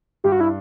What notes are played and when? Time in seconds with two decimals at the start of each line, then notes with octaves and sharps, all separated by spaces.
0.24 G2 G4
0.32 F#4
0.39 D4 E4